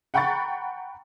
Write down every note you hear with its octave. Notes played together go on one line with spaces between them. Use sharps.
F#5 G5 A#5 B5 C#6 A6